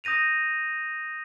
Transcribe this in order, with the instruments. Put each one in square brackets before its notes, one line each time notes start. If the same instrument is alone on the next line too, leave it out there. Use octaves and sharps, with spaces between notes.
[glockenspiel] D#6 G6 A#6 D#7 F7